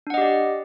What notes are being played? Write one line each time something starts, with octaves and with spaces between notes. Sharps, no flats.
D4 G4 D5 D#5 F#5